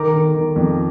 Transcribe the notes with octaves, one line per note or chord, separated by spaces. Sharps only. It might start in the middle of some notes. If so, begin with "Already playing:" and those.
Already playing: D#3 A#5 D6
D#3
D#3
F2